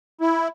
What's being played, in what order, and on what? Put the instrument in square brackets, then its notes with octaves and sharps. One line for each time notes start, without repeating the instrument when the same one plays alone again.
[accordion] E4